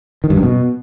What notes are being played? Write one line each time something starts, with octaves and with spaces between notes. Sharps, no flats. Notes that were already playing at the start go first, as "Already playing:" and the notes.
D#3
G2
F#2
B2